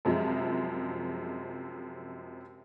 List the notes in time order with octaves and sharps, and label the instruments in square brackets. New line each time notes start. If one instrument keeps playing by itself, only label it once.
[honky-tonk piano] F#2 C3 F3 G#3